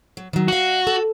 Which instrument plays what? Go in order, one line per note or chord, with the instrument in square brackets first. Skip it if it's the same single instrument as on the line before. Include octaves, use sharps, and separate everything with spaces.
[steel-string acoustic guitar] F#3
D#3 F#3
[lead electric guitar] F#4 [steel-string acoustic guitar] D#5 F5
[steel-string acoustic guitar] A4